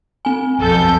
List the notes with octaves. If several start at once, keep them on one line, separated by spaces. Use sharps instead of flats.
C4 G#5
B1 F2 A4 G6